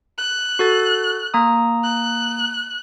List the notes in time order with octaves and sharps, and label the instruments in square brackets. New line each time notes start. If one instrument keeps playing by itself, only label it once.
[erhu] F#6
[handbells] F#4 A4 A6
A#3 A#5 D#6
[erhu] F#6